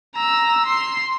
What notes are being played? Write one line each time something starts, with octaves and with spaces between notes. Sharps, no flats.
A#5 E6
C6